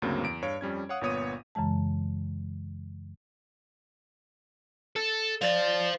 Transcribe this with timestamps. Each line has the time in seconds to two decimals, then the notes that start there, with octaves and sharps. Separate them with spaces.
0.02 D2 G2 C#3 F#3 A#3 C4
0.24 E2 D7
0.42 G2 C#5 F5 D7
0.61 F2 G3 C#4 G#6
0.89 C#5 F5 F#5 D#6
1.01 G1 A#2 B3 C#5 D#6 D#7
1.55 F#2 C#3 E3 G#3 A5
4.96 A4
5.42 C5 D5 F5